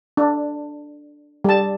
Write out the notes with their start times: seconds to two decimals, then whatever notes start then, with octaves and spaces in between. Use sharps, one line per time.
0.17 D4
1.44 G3 A5